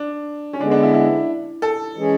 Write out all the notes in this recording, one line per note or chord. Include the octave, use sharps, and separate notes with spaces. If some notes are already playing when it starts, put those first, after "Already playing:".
Already playing: D4
C#4
D3 G#3 B3 D4
D4
E4
E4
A4
E3 G#3 C#4 G#4